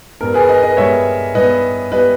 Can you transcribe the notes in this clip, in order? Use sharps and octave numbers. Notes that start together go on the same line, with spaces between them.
G2 G3 B3 A#4
G#4 B4
B4 D#5
B4 D#5
G2 G3 B3 C#5 E5
G2 G3 B3 B4 D#5
G3 B3 B4 D#5